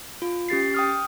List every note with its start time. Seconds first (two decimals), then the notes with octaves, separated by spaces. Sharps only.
0.22 F4
0.49 C#4 G4 A6 C7
0.74 G5 D#6 F6